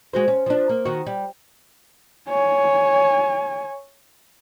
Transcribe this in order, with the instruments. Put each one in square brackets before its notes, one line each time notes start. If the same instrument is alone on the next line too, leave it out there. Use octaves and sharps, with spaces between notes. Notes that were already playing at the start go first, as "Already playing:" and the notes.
[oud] G#3 F#4 C5
C#4
F3 D4
A#3
D#3 F#4
G3
[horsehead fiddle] C#5 G#5